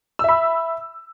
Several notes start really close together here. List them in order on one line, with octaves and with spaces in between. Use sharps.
E6 E5 B5